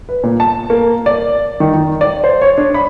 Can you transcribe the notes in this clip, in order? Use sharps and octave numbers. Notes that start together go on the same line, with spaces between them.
B4
A#2
A5
A#3
D5
D#3
D#3
D5
C5
C#5
D4
B5